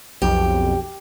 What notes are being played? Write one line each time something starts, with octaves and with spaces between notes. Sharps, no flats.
B1 F2 G4